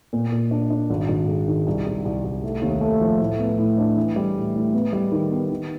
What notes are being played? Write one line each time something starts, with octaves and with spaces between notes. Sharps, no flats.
A#2
A#2
D4
D4
G#1
G#1
G#3
D#3
C2
C2
C2
C2
A3
D#2
A3
F3
A2
B3
A2
D4
E3
G3
A2
A2
B3
G3
D#3
B3
D#3